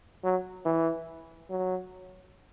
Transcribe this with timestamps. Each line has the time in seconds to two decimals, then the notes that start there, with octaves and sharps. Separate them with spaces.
0.24 F#3
0.65 E3
1.50 F#3